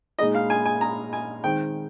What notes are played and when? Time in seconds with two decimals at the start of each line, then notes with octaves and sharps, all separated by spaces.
0.19 A#2 G#3 D#4 G#4 D#5
0.35 F5
0.50 G#5
0.66 G#5
0.81 A#5
1.13 G#5
1.43 D#3 G#3 C4 G5